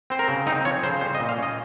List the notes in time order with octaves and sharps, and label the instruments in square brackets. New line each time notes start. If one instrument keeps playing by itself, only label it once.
[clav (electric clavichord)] C4 C5
A#4
C#3
C4 D#4
F3 C#5
C#3 C5
G3 C5
D#5
A#2
F5
C#4 D#5